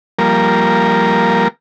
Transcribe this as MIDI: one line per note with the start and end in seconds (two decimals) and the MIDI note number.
0.19 1.48 53
0.19 1.48 55
0.19 1.48 58
0.19 1.48 70